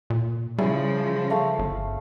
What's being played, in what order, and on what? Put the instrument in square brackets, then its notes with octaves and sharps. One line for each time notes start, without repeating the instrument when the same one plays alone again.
[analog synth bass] A#2
[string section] C#3 F3 [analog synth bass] G3 [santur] C#4 E4 G#4
[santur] A3 F5
[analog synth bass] G1